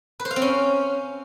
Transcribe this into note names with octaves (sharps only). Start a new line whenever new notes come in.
B4
C5
F5
C4
C#4